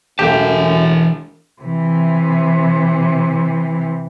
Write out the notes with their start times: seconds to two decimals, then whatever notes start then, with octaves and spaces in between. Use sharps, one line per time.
0.19 E1 F#2 E3 A3 G4 F5 A5
1.62 C3 E3